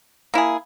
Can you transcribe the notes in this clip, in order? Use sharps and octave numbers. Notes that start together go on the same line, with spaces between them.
A#3 E4 G#4